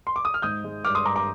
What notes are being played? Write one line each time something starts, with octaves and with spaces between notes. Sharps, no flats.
C6
D6
D#6
F6
G#2 D#6 G6
G#3
G2 D6 F6
C6 D#6
G2 A#5 D6
A#5 D6